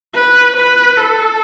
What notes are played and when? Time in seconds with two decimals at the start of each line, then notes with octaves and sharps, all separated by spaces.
0.14 B4
0.56 B4
0.97 A4